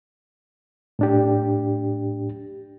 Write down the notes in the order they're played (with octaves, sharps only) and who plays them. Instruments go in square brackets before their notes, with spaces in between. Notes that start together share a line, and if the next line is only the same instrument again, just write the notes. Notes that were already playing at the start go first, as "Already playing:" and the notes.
[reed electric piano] A2 D4 G4